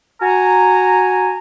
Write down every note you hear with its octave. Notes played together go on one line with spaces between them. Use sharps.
F#4 G#5 A#5